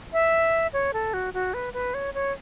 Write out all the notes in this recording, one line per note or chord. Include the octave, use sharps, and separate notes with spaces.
E5
C#5
A4
F#4
F#4
B4
B4
C#5
C#5